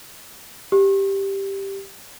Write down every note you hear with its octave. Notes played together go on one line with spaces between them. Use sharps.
G4